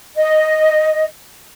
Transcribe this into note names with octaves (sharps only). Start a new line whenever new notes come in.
D#5